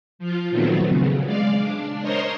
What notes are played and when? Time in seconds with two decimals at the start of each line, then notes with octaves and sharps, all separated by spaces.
0.19 F3 F4
0.50 A#2 D#3 F#3 A3 B3 C4
0.86 C#3
1.24 G#3 D5 F5
1.59 D4
2.01 A#4 C5 C#5 D#5 A#5 C6